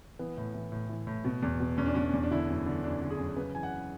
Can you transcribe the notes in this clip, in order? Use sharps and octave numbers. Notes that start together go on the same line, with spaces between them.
E3 B3
A2
E3
A2
E3
A2
B2
E2
B2
E2 C#4
D4
B2 C#4
E2
D4
D3 E4
F#2
D3
F#2 D4
D3
G#4
F#2
C#3 B4
E3 G#5
F#5